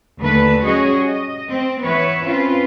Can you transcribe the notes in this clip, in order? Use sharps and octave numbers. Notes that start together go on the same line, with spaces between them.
D#2 D3 A3 B4
G3 C#4 F#4 G#4 C#5 D#5
D#5
C4
E3 B3 B4 C#5 E5
C4 C#4 F4 B4